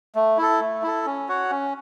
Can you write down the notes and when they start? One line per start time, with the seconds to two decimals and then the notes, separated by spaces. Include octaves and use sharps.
0.15 A3
0.38 E4 A4
0.61 A3
0.83 E4 A4
1.06 C#4
1.29 F#4 C#5 F#5
1.51 C#4